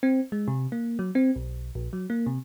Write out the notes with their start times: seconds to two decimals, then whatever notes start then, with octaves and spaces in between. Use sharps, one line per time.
0.03 C4
0.32 G#3
0.48 C3
0.72 A#3
0.99 F#3
1.15 C4
1.36 B1
1.75 A#1
1.93 F#3
2.10 A#3
2.26 C3